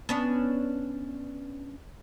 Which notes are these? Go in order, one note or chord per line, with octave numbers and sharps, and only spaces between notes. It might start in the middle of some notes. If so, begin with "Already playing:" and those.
B3 C#4 D4